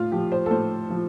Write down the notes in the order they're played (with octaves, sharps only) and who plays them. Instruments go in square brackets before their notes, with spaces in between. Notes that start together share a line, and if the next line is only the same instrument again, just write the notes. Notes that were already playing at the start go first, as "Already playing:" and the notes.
Already playing: [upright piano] A2 F4
F3 G4
C5
A4
A2 C5
F3